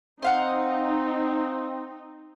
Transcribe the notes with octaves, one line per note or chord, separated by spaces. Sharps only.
C4 D#4 C5 F5 F#5